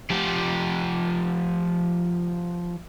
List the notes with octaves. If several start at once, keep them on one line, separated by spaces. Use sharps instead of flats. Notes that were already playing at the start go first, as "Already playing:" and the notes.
F3 G4